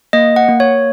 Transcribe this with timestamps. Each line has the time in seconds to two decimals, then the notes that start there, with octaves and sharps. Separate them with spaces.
0.13 A#3 D#5
0.36 F#5
0.49 A#3
0.60 C#5